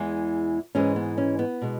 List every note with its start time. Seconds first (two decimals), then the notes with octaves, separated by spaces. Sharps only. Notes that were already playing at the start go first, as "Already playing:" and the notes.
Already playing: E2 E3 G#3
0.75 G#2 E3 G#3 C#4
0.96 B3
1.17 C#4
1.39 B3
1.62 B2 G#3